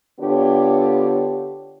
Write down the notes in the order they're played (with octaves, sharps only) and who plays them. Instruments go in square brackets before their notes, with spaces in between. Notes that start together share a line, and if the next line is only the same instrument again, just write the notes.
[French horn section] D3 B3 D4 F4 G4 C#5